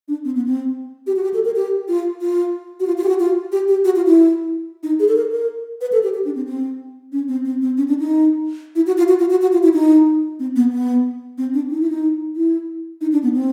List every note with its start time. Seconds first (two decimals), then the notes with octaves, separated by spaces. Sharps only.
0.08 D4
0.25 C4
0.35 B3
0.46 C4
1.07 G4
1.16 F#4
1.23 G4
1.34 A4
1.45 A#4
1.56 G4
1.88 F4
2.21 F4
2.80 F#4
2.87 F4
2.97 F4
3.04 G4
3.08 F#4
3.20 F4
3.52 G4
3.68 G4
3.85 F#4
3.96 F4
4.06 E4
4.83 D#4
4.99 G#4
5.08 A4
5.16 A#4
5.32 A#4
5.81 B4
5.92 A4
6.03 G4
6.14 G4
6.25 D4
6.35 C4
6.46 C4
7.12 C#4
7.28 C4
7.45 C4
7.61 C4
7.77 C#4
7.88 D4
7.99 D#4
8.75 E4
8.87 F#4
8.98 F4
9.08 F#4
9.19 F4
9.30 F#4
9.41 F#4
9.52 F4
9.63 E4
9.74 D#4
10.39 C4
10.56 B3
10.72 B3
11.38 C4
11.54 D4
11.70 D#4
11.80 E4
11.89 D#4
12.36 E4
13.01 D#4
13.12 D4
13.23 B3
13.34 C4